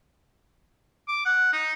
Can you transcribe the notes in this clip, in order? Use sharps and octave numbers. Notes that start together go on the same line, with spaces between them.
D6
F#5
D#4